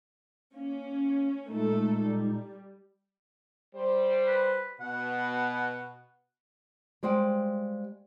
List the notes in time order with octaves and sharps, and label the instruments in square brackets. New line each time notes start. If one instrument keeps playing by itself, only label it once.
[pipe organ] A#3 [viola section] C#4
[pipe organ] A#2 G#3 D#4 [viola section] A3 A4
[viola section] G3
[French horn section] G3 C5
[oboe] B4
[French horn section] B2 [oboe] F#5
[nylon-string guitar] G3 G#3 C5 F5 G5